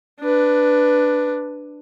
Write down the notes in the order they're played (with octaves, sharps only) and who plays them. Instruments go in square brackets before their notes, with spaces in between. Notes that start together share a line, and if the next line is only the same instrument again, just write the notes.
[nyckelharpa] D4 B4